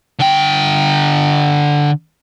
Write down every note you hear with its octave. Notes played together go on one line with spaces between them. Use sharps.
D3 G5